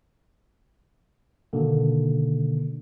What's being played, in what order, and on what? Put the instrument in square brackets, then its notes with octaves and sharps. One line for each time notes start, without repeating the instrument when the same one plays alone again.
[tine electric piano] B2 D3 D#3 A#3